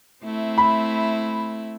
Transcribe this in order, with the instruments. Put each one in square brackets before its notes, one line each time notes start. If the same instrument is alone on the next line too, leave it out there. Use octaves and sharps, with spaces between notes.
[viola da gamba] A3 C4 E4
[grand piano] B5